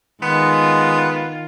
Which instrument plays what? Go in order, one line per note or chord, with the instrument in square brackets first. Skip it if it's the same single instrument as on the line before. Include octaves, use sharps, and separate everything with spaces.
[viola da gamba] D#3 F4 [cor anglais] G#3 [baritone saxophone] B3